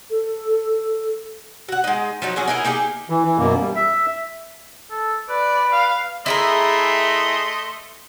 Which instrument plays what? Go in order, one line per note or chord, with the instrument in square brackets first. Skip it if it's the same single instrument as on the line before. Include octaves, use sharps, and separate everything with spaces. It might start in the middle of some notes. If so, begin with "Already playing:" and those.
[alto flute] A4
[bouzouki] F#4 F#5
G#3 D#4
F3 F#3 D#4
F#3 C#4 F#4 G#4
D#4 E4 G#4 A#4
A#3 D#4 G4 G#4
[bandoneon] E3
E3
F#2 B2 A#3
G3
E5
[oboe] A4
[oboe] B4 [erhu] D5
[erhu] F5
[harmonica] A3 D#5 C6 [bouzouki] E4 G#4 A#4